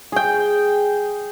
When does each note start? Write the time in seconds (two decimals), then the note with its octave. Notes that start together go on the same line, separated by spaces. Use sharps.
0.12 G#4 G5